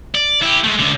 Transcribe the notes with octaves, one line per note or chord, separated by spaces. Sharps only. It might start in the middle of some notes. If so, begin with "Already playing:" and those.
D5
E4 G4
G#3 A3
C#2 D3